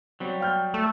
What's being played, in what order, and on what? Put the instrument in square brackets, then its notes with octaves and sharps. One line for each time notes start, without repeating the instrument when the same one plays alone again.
[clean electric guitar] F#3 G3 [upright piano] C4
[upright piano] G5 F6 G6
[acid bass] A3